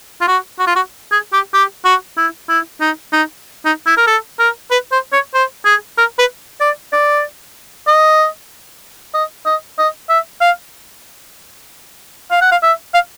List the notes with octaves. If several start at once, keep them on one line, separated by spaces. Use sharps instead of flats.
F4
F#4
F#4
F4
F#4
G#4
G4
G4
F#4
E4
E4
D#4
D#4
D#4
E4
A#4
A4
A#4
B4
C5
C#5
C5
G#4
A#4
B4
D5
D5
D#5
D#5
D#5
D#5
E5
F5
F5
F#5
F5
E5
F5